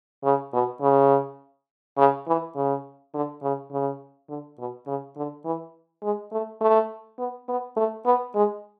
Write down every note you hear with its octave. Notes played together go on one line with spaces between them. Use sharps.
C#3
B2
C#3
C#3
E3
C#3
D3
C#3
C#3
D3
B2
C#3
D3
E3
G#3
A3
A3
B3
B3
A3
B3
G#3